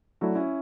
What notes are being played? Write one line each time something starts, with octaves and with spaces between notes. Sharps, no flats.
F#3 A3 D4 E4 F#4 A4
C#4 E4